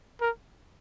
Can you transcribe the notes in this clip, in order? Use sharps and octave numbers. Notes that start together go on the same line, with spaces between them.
A#4